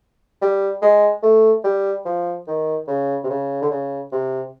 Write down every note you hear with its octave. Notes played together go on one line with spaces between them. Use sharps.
G3
G#3
A3
G3
F3
D#3
C#3
C3
C#3
D3
C#3
C3